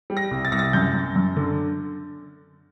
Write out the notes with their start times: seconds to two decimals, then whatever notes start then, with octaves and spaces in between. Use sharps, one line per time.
0.10 G3
0.17 A#6
0.31 C2
0.45 A6
0.52 C2 A#6
0.59 A6
0.73 F#2 G6
0.94 F#2
1.16 F#2
1.36 D3